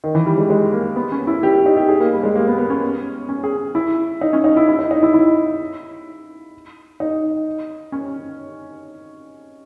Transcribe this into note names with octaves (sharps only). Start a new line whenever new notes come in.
D#3
E3
G3
G#3
G#3
A#3
B3
C#4
E4
G4
G4
D#4
G4
G#4
A#3
G3
G#3
A#3
B3
B3
C#4
C#4
G#4
E4
D#4
C#4
D#4
E4
E4
D#4
D#4
E4
E4
D#4
C#4